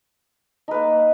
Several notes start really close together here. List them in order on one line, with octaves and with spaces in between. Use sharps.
D#4 B4 A#3